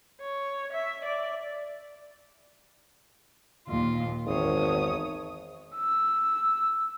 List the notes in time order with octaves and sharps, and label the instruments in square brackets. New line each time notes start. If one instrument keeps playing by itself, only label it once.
[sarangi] C#5
E5
D5
[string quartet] D#2 A#2 F4
[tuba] G#1 [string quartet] E2 C#5 D#6
[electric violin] E6